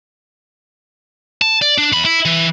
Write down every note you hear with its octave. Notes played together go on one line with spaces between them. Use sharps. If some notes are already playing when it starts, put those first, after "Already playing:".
A5
D5
D4
E2 B5
E4
E3